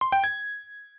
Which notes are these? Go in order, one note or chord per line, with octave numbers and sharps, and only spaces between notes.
C6
G5
G#6